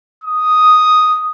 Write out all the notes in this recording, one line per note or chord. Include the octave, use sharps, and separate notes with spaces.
D#6